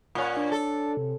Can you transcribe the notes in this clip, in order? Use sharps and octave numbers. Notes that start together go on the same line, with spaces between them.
A#2 C#4 F#5
D4
A4
C3